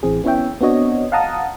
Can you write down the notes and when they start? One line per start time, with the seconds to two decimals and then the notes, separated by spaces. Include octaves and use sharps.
0.03 A1 E3 C4 G#4
0.24 B3 C#4 E4 C#5 E5 G5
0.61 B3 C4 D4 F#4 C#5 D#5
1.12 F5 F#5 A5 A#5 D#6